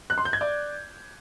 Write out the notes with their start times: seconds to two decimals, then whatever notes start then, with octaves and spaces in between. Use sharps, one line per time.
0.10 F#6
0.18 C6
0.25 G6
0.33 G#6
0.41 D5